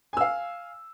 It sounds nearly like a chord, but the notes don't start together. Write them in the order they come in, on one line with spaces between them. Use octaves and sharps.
G#5 E6 F5